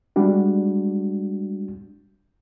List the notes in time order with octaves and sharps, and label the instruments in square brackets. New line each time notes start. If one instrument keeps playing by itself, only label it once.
[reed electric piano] G3 G#3 D4 F#4